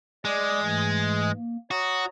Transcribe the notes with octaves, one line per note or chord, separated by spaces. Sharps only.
G#3 D5 D6
G#2 E3 A3
A#3
F#4 C#5 A#5 D#6